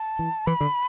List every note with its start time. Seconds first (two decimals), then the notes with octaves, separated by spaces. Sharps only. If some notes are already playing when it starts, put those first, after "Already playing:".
Already playing: A5
0.19 E3
0.46 E3 B5
0.61 D3